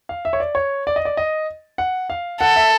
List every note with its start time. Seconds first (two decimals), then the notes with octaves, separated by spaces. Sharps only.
0.09 F5
0.25 E5
0.33 C#5
0.40 D5
0.55 C#5
0.87 D5
0.96 D#5
1.05 D5
1.17 D#5
1.78 F#5
2.10 F5
2.41 A4 F#5
2.56 E5